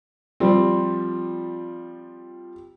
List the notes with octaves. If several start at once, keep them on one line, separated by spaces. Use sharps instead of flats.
F3 G3 C4